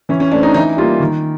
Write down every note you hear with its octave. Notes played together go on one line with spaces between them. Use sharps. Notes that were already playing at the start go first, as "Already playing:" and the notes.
E3 C#4
C#4
A3 C4 D4
D#4
E3 D#4
G3 A#3 F4
D#3